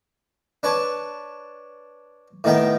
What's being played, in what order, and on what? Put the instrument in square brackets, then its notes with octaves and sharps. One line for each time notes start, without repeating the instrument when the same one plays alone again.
[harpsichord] D4 B4 C#5 A5
A2 D#3 B3 G5